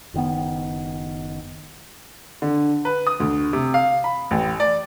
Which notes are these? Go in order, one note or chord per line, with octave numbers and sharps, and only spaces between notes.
F#1 D#3 B3
D3
B4
D#6
D2
C3
F5
B5
A1
D5